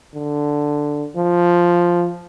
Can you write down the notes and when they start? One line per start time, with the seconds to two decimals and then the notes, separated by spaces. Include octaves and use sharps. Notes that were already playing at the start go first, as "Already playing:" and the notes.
0.14 D3
1.16 F3